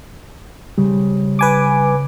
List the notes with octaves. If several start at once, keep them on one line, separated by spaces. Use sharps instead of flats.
C#3 G3 C4
B4 G#5 D6